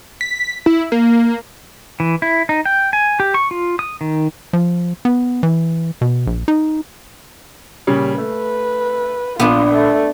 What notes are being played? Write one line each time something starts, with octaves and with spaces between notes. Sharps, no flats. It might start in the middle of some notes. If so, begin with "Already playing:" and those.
B6
E4
A#3
E3
E4
D#4
G5
G#5
G4
C#6
F4
D#6
D#3
F3
B3
E3
B2
A#1
D#4
A#2 C#3 G3
A3 B4
A#1 B3 D4 F4
A3